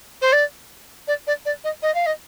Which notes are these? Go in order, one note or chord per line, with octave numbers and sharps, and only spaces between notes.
C5
D5
D5
D5
D5
D#5
D#5
F5
D#5